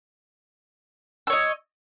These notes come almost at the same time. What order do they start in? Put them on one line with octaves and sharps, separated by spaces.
E6 C#5 D#5